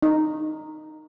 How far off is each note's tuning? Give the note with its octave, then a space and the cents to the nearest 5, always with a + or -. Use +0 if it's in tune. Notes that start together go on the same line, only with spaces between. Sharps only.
D#4 -10